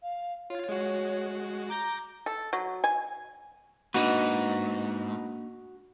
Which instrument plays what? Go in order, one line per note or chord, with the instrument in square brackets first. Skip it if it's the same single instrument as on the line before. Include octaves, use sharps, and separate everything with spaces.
[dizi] F5
[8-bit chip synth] F4 [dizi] C#5
[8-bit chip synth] G#3 F#4
[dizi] A#5 [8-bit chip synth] D6 G6 A#6
[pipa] A4
F#3
G#5
[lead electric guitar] G#2 [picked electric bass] A#3 C4 D4 [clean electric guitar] D#4 B4 [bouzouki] F#4